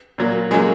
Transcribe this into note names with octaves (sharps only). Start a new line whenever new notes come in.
A#2 F#3 A#3
C#3 F#3 G#3 A#3 G#4